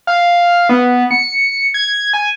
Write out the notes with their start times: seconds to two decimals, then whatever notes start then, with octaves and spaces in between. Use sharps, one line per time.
0.07 F5
0.69 B3
1.11 C#7
1.74 G#6
2.13 G#5